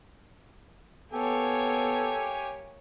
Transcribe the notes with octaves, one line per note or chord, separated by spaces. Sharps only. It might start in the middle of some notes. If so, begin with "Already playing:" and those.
A#3 B3 G4 A4 C#5 G#5